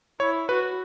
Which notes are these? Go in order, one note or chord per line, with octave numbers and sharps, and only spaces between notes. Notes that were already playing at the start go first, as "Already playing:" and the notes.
E4 C#5
F#4 B4